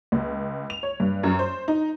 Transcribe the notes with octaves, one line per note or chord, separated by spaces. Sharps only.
C#2
F7
C#5
G2
F#2
C5
D#4